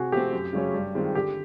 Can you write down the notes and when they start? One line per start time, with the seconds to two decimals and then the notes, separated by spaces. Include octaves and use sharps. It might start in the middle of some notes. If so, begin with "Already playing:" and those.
Already playing: C3 F#4 G#4
0.12 F3 A3 C4 G4
0.33 F#2
0.53 C#3 F#3 A3 C#4
0.74 G2
0.95 D#3 G#3 C4 F4
1.15 D3 G4